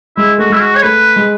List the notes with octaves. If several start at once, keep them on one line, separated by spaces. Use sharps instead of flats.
G#3 E4
A3 F#4
G#3 E4
F#4
C#5
A3 B4
G#3